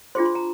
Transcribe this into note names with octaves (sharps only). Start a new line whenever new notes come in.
D4 F4 G#4 C5 C6
C6
A#5